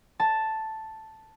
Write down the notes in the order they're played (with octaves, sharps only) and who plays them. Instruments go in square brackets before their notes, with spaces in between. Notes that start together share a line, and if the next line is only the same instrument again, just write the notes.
[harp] A5